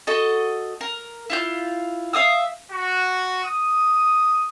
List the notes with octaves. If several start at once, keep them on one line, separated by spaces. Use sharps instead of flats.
F#4 A4 D#5
A#4
E4 F4 G6
E5 F5 D#6 E6
F#4
D#6